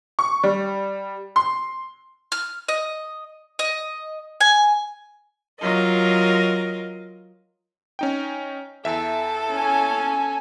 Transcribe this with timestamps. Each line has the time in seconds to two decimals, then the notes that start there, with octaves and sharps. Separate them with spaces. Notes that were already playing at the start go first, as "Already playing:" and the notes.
0.19 C#6
0.43 G3
1.36 C6
2.32 F6
2.68 D#5
3.59 D#5
4.40 G#5
5.61 F#3 F4 A#4 D#5
7.99 C#4 D#4 G5
8.85 E2 A4 E5
9.52 C#4 G#5